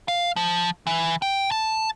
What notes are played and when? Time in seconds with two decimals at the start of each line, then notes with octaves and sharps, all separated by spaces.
0.08 F5
0.36 F3
0.87 E3
1.22 G5
1.51 A5